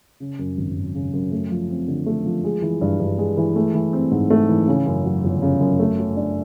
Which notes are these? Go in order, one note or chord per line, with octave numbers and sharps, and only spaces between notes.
C#3
F#2
G#1
G#1
C#3
F#2
A3
F3
C4
D3
A3
F3
G#3
E3
G2
G2
G#3
E3
A3
E3
C4
G#2
A3
E3
C#3
F#2
F#3
G1
C#3
F#2
A3
F#3
D4